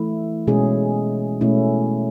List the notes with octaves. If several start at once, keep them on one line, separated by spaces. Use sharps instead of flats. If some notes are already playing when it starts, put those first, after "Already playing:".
Already playing: E3 A3 E4
B2 G#3 C#4 G#4
B2 A3 C#4 E4